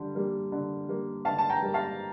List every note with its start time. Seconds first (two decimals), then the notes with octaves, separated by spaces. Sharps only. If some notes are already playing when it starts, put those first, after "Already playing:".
Already playing: D3 G3
0.15 G3 A#3
0.52 D3
0.88 G3 A#3
1.25 D3 F5 A5
1.38 A5
1.50 G5 A#5
1.62 G3 A#3
1.74 F5 A5